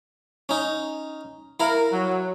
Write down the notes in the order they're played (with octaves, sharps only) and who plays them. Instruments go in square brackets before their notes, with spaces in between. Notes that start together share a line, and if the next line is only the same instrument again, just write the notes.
[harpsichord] C#4 D#4
[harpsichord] E4 F5 [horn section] A#4
[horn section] F#3